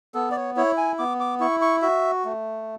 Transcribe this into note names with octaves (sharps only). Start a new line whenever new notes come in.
B3 A4
D5
C#5
E4 C#5
G#5
B3 D6
D6
E4 C#6
C#6
F#4 E5
A3